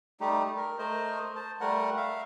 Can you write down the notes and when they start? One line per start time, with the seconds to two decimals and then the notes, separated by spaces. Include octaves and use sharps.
0.20 G3 A3 D#4 G4
0.57 A#4
0.78 A3 A#4 C5 D#5
1.36 C5 A5
1.61 G3 A3 A#4 F#5
1.97 E5 F5